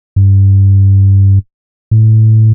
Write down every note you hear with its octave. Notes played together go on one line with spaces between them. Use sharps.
G2
A2